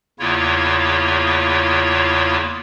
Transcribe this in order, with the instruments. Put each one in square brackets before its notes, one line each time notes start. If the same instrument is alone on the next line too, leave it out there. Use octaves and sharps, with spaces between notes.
[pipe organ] E2 C#3 A#3 E4 F4 C#5